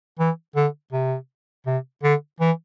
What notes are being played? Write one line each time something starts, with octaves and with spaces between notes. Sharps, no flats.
E3
D3
C3
C3
D3
E3